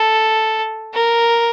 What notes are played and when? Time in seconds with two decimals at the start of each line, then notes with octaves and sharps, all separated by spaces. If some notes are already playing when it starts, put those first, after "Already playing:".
Already playing: A4
0.94 A#4